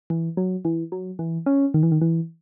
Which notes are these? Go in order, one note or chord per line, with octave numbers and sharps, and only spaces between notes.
E3
F#3
E3
F#3
E3
C#4
D#3
E3
D#3
E3